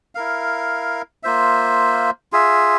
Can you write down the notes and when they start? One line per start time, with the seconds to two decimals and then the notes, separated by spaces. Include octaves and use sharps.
0.15 E4 A#4 F5
1.23 A#3 F4 C5 E5
2.32 F4 G#4 E5